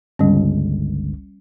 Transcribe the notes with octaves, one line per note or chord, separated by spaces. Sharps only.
G1 C#2 G3 C#4